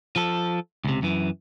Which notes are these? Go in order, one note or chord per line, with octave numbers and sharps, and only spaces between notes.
F3 A4
C#2 C3
F#2 E3